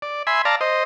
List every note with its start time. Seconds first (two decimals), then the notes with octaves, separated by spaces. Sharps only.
0.02 D5
0.27 E5 G#5 B5 C6
0.45 D5 F5 A5 A#5
0.61 C5 D#5